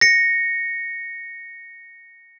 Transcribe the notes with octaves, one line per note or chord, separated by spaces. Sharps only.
A#6 C#7